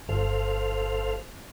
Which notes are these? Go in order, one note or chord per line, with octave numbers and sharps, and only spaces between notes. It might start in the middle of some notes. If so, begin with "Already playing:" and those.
G1 A4 C5 F5